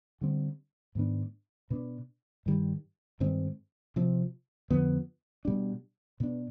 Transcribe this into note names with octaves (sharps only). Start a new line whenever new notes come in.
D3 G3 C4
G#2 D#3 B3 D4
B2 B3 D4
G2 D#3 G3
G2 D#3 G#3 C4
C3 F3 C4
F2 D3 F3 B3
B2 G3 D4
B2 B3 D4